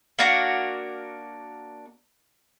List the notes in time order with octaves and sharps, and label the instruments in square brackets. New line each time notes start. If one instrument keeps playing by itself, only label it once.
[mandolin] A#3 D4 F#4 A#4